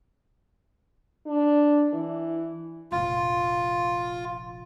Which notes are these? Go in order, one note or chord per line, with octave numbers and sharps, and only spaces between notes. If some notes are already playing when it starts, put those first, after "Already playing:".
D4
E3
F1 A#1 F4